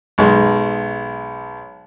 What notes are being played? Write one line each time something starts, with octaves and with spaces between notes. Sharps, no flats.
B1 G#3